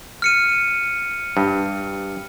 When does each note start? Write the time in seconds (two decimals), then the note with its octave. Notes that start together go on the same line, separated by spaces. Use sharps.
0.22 F6 C#7 D#7
1.37 G2